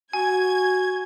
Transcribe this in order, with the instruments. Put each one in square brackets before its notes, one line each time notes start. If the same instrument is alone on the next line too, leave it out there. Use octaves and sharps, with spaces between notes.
[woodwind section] F#4 [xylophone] G#5 [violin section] G#6